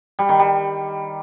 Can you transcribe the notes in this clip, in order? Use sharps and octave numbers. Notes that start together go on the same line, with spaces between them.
G3
D#3
G3